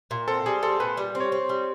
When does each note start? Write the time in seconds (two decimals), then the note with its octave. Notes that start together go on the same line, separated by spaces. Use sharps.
0.11 A#2
0.28 C4 A4
0.46 G3 G#4
0.63 C4 A4
0.80 A#2 B4
0.97 G3
1.15 C4
1.20 C#5
1.32 C4
1.49 G3